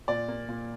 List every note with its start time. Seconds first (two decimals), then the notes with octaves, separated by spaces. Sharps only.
0.08 A#2 D5
0.28 A#3
0.49 A#2